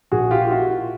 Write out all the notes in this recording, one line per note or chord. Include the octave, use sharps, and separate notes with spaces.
A#1 F#4 G#4
F4 G4
A#2
F4
E4 F#4